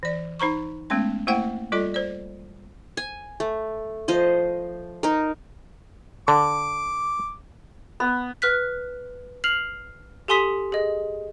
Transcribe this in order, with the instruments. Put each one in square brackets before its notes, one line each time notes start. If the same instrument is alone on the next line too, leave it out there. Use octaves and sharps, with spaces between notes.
[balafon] E3 D5
D#4 C5 A#5 C#6
G#3 A3 B3 C#4 C6
A3 A#3 E4 C5 F#5 G5
G3 F4 A4 D5 D#5
C5 D5
[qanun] G#5
A3
F3 C5 D#5
D#4 A#4
[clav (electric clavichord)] D3 [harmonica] D6
[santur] B3
[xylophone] B4 F6 F#6 B6
F6 C7 F7 F#7
G4 A4 G#5 C6 D#6 B6
G#4 D#5